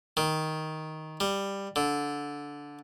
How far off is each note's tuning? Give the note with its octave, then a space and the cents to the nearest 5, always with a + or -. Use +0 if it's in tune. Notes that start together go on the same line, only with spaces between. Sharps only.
D#3 +10
G3 +10
D3 -15